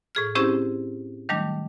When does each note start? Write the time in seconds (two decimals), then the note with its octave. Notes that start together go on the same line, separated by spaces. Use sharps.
0.15 A2 G#4 F6
0.35 C4 C#4 E4 G4 G#4 C5
1.29 D#3 F#3 G3 A3 D4